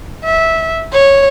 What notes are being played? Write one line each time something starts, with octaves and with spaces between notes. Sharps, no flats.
E5
C#5